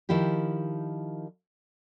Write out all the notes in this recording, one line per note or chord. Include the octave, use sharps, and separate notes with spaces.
D#3 F3 E4 F4 G4